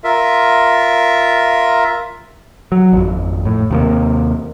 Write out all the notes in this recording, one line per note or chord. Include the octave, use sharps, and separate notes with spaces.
F4 A#4 E5
F#3
G#1 F2
A2
D#2 C3 A#3